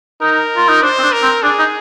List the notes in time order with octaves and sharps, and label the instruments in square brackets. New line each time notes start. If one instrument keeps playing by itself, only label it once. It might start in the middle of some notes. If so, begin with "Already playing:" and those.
[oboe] D#4 [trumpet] A#4
[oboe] F4
D#4
[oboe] D4 [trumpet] C5
[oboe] C4
D4
[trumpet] A#4
[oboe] C4
[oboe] D4 [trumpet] G#4
[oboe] D#4